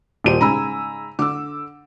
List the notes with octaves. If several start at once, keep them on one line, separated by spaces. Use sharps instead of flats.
D#1 A#2 G4 C5 D#7
G#2 C#3 G#5 A#5 B5 E6
D3 D6 E6